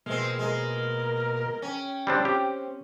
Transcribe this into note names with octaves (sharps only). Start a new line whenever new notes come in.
B2 G#3 A#3 C4 F6
G#3 A#4
C#4 G5
G3 C4 D4
C4 G4